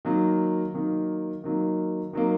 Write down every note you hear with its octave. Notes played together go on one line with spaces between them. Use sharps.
D#3 F#3 A#3
D#3 F#3 A#3
D#3 F#3 A#3
D#3 F#3 A#3